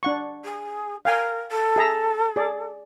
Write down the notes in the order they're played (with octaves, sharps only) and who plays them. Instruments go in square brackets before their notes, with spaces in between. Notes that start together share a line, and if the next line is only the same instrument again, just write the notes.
[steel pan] D4 F#5 C#6
[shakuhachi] G#4
[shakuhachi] A#4 [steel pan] F5 G5 G#5
[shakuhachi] A4
[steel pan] G#4 E5 A#5
G#4 D5